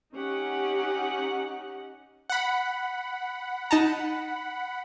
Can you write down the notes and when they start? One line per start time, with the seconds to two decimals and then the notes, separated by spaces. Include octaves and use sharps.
0.14 C#4 D#4 G4 F#5
2.30 F#5 B5
3.71 D#4 A5 A#5